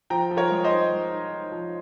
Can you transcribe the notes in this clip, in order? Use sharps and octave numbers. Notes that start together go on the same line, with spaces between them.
F3 G5 A#5
F3
A#4 C#5
G#3
C5 D#5
D#4
G#3
D#4
D#4
F3